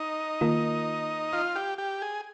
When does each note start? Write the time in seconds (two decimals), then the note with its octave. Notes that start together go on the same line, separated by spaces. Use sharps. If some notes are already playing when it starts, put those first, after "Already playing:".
Already playing: D#4
0.41 D#3 A#3 F4 A#4
1.33 F4
1.56 G4
1.78 G4
2.02 G#4